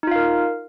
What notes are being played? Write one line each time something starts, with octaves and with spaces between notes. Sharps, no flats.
D#4 F4 A#4 F5